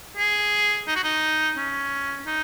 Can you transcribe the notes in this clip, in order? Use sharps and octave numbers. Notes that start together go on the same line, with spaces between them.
G#4
D#4
F#4
D#4
C#4
D#4